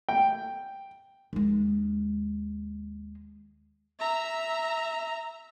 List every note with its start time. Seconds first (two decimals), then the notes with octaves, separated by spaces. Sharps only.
0.09 G5
1.33 D#2 G#3
3.99 E5 A#5